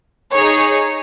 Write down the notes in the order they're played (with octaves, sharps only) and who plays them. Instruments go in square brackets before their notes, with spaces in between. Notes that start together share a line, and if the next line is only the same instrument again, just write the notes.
[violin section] D#4 G#4 C#5